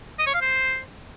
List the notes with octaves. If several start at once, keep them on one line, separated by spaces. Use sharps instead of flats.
D#5
C#5
F5
C5